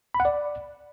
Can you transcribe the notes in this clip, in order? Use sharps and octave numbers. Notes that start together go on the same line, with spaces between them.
B5
F#5
D5